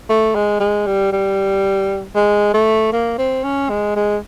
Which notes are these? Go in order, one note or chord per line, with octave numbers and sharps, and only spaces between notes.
A3
G#3
G#3
G3
G3
G#3
A3
A#3
C4
C#4
G#3
G#3